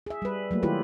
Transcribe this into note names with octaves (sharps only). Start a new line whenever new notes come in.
G#4 E5
G3 B4
F#3 A3 A#3
D#3 E4 F4 G4 B4